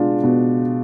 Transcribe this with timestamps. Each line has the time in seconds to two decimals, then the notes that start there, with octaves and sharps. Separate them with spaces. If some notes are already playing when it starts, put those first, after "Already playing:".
Already playing: B2 G#3 D4 F4
0.24 B2